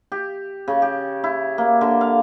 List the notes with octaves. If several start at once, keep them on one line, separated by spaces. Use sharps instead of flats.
G4
C#3
G4
E4
A#3
D3
F5